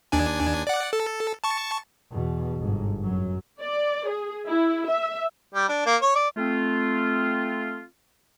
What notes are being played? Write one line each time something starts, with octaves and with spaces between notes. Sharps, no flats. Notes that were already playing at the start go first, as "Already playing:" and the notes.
D#2 D4 G#5
D5 F#5
A4
A5 C#6
E2 B2
G1 G#2
F#2 F#3
D5
G#4
E4
E5
G3
D4
A#3
C#5
D5
A3 C4 F4